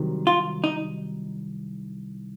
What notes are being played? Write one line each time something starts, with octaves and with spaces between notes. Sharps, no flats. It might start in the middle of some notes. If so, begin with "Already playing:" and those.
Already playing: C2 C3 D#3 F#3
F4
D#4